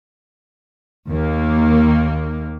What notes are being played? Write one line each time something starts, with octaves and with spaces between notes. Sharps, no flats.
D#2 A#3